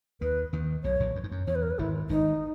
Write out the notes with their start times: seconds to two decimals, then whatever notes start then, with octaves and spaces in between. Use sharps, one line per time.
0.21 D#2 D#3 B4
0.53 D#2 D#3
0.84 B1 B2 C#5
1.00 A#1 A#2
1.16 F#2
1.24 G#2
1.31 F#2
1.47 E2 C#5
1.55 B4
1.62 A#4
1.70 B4
1.79 G#1 G#2 E4
2.09 G#1 G#2 D#4